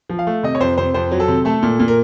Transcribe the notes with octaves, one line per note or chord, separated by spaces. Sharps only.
F3
F5
A3
C3 D#5
C#5
F2 C5
C3 C5
F2 C5
F#3
A4
C3
A3 A4
A#2
A#2
A#4